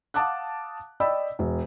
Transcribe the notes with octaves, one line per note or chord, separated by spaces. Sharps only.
F5 F#5 A5 D6 D#6 F#6
D5 D#5 G5 B5 E6
E1